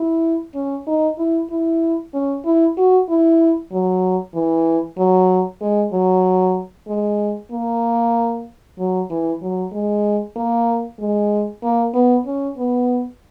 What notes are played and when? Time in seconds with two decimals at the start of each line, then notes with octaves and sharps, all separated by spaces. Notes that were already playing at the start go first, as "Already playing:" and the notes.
Already playing: E4
0.54 C#4
0.87 D#4
1.18 E4
1.50 E4
2.14 C#4
2.45 E4
2.77 F#4
3.09 E4
3.72 F#3
4.34 E3
4.97 F#3
5.61 G#3
5.93 F#3
6.87 G#3
7.51 A#3
8.78 F#3
9.10 E3
9.42 F#3
9.73 G#3
10.36 A#3
11.00 G#3
11.63 A#3
11.94 B3
12.26 C#4
12.57 B3